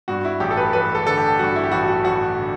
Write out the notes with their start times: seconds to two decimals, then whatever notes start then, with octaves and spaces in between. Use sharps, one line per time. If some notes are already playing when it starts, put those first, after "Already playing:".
0.08 G2 F#4
0.25 E4
0.40 A1 G4
0.51 A4
0.57 B4
0.73 A1 B4
0.95 A4
1.06 D3 A4
1.17 G4
1.39 G2 F#4
1.56 E4
1.64 G4
1.72 A1 F#4
1.88 F#4
2.04 A1 F#4
2.37 D3